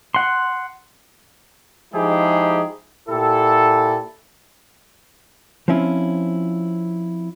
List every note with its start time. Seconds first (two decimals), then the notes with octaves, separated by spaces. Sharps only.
0.15 F#5 C6
1.93 F3 G#3 D#4 E4 G4 G#4
3.09 A#2 E4 G4 A4
5.68 F3 C4 C#4 E4 F4